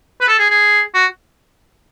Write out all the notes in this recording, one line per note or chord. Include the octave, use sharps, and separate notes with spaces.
B4
A4
G#4
G#4
F#4